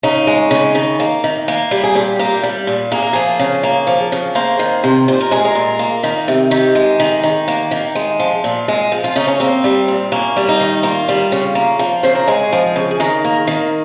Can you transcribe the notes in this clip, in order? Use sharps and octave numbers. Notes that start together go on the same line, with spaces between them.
C#3 D#4
G#3
C#3
D#3
A#3
D#3
A#3
G3 G4
G#4
A#2 G4
A#3 G4
G3
A#2
A#3 G#4
A#4
F3 G#4
C#3
A#3
F3
C#3
A#3 C5
D#3
C3
A#2 C5
A#4
G#3 G#4
A#4
A#2
A#3
D#3
C3
D#3 G4
G#3
D#3
D#3
A#3
D#3
G#3
F3
A#2
G#3
F3
F4
C#3 D#4
C#4
A#3 C4
G3
A#2
A#3 C#4
G3
D#4
D#3
A#3 F4
G3
C#3
A#3
F3
C#3 C5
A#4
G#3 G#4
F3
C#3
G#4
D#3 A#4
A#3
D#3